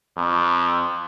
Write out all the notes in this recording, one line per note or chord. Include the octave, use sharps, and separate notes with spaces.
F2